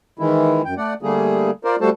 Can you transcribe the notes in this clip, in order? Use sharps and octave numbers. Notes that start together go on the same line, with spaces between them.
D#3 E3 G#3 E4
F#2 G5
A3 D5 F#5
D3 G3 A3 A#3 G#4
F4 A#4 C5 D5
G3 A3 F#4 A4 C5 A5